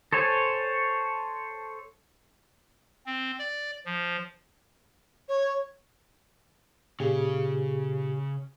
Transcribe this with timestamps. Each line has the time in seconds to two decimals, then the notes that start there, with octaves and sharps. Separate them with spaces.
0.13 A4 C5 C#5 G#5
3.06 C4
3.39 D5
3.86 F3
5.28 C#5
7.00 A#2 C#3 G4 G#4